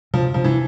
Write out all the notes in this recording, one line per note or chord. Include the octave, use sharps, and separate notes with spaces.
C3 F3
C3 F3
E3